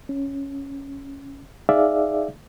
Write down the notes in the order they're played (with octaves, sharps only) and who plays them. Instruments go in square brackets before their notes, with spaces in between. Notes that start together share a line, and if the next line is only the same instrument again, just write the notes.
[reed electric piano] C#4
D#4 G#4 D5 E5 F5